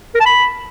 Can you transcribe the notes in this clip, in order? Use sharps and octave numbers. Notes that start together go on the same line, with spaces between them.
A#4
A5
B5